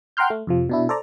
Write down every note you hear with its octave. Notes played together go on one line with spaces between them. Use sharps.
F#5 G5 A#5 C6 F6 G6
A3
F2 C3 F3
B2 D4 E4
A4 C5 D5 A#5